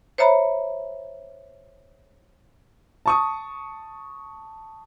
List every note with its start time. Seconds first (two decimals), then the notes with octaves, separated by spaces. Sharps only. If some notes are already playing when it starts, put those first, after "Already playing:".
0.18 C5 C#5 E5 A#5 B5
3.06 A5 C#6 D#6